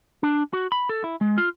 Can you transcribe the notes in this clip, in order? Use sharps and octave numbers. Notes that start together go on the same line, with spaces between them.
D4
F#4
B5
A4
E4
G#3
F4